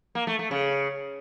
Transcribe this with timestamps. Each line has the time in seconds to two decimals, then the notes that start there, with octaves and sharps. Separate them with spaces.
0.15 A#3
0.27 A3
0.39 A3
0.51 C#3